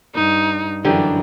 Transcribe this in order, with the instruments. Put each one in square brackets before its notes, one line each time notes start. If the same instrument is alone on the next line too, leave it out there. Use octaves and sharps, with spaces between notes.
[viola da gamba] G2 [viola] D#4
[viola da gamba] F#2 E3 [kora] D3 D#4 G4 [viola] D4